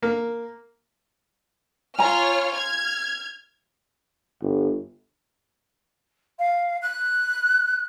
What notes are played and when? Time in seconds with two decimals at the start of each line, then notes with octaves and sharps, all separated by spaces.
0.02 A#3
1.99 F4 C#5 G#5 A#5 F6
2.51 F6 G#6
4.42 G1
6.38 F5
6.81 F#6